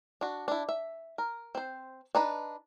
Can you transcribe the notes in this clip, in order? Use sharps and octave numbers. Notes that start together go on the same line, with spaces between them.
D4 F#4
D4 E4
E5
A#4
C4 C5
D4 D#4 B4